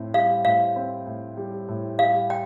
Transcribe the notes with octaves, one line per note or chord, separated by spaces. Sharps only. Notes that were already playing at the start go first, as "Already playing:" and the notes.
Already playing: A2 C4
G3 F5
A2 F5
C4
A2
G3
A2
G3 F5
G5